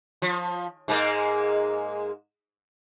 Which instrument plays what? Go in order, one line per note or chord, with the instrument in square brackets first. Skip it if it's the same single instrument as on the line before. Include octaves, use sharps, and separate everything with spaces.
[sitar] F3
G#2 G#3 A#3